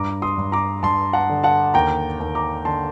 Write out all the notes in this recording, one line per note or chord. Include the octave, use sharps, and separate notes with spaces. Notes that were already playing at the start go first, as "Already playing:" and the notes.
Already playing: G2 A#5 D6
C6 D#6
G2
A#5 D6
G2 A5 C6
F#5 A5
D3
F#5 A5
D#2 G5 A#5
D#2
A#5 D6
D3 A5 C6